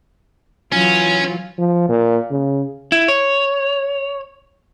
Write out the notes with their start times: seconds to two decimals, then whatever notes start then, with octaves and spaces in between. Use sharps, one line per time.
0.72 E3 F#3 C#4 F4
1.58 F3
1.89 A#2
2.31 C#3
2.92 E4
3.08 C#5